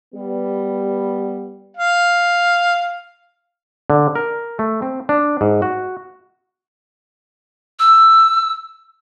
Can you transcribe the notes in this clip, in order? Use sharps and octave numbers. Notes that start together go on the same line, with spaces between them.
G3 B3
F5
D3
A#4
A3
C4
D4
G#2
F#4
E6